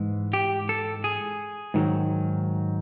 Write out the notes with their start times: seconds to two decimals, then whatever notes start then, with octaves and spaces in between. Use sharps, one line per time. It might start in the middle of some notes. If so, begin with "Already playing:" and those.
Already playing: G#2 E3 G#3
0.33 G4
0.69 A4
1.04 G#4
1.74 G#2 D#3 F#3